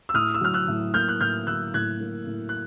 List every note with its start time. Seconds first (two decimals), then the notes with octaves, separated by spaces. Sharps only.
0.09 E6
0.14 A2 D#6 F6
0.34 E6
0.41 F#3 F6
0.54 E6 F#6
0.68 A2
0.94 A#3 F6 G6
1.09 F#6
1.20 A2 F6 G6
1.47 F#3 E6 F#6
1.74 A2 F#6 G#6
2.00 A#3
2.26 A2
2.49 F#6